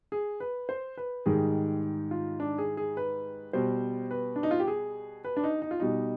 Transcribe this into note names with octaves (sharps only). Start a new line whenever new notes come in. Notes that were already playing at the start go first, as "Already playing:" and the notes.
G#4
B4
C5
B4
G#2 D#3 G3 G#4
F4
D4
G#4
G#4
B4
B2 G3 C5
B4
D4
D#4
F4
G4
G#4
B4
D4
D#4
D#4
F4
B2 G3 D#4